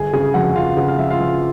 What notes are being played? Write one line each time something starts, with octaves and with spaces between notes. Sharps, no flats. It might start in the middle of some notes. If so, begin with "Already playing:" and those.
Already playing: G1 G#4 G#5
C#3 G#4 G#5
F2 F#4 F#5
C#3 F4 F5
C#3 F#5
F5
F3 E5
F4 F5
F3